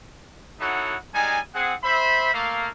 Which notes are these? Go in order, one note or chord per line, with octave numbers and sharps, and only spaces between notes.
D#4 E4 F#4 A4 C#5 F#5
G3 G#3 D#4 G#5
C4 G#4 F#5
C5 E5 B5
A3 A#3 F5